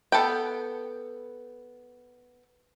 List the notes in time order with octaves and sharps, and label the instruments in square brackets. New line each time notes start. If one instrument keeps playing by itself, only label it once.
[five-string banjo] B3 A4 B4 G5